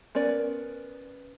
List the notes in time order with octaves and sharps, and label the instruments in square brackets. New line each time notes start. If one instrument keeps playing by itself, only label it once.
[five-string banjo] B3 C#4 A#4 D5